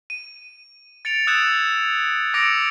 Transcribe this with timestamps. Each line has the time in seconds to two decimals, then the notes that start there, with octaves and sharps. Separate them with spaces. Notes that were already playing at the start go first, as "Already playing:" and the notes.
0.10 D#7
1.05 A6 C#7 D7 F7
1.27 D#6 E6 F#6 G#6 C#7 E7
2.34 D6 E6 A#6 C#7 D7 F7